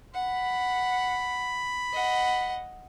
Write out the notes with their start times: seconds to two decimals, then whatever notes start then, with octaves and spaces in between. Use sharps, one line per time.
0.14 F#5 B5
1.93 D#5 F#5